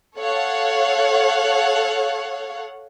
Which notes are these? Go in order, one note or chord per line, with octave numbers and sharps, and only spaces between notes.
A4 C#5 F5 F#5